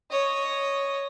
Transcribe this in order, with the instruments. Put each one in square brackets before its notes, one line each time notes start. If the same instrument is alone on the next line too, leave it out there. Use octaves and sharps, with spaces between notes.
[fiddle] C#5 D#5